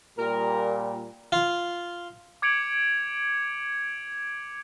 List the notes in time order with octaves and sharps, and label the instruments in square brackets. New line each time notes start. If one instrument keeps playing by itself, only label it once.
[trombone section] A#2 G3 [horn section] A#4
[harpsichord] F4
[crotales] D6 G#6 C#7 D7 F7 F#7